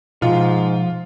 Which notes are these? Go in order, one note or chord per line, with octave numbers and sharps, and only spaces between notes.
G#2 B2 F3 F4